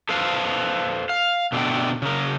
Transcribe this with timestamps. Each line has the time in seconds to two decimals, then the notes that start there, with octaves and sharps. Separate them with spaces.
0.09 A4 B4 C5 F5
1.09 F5
1.52 B2 D3 A3 C4 G5
2.02 C#3 A#4